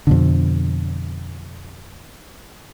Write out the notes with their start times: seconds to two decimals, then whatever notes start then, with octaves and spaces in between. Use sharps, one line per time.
0.07 F2 B2 D3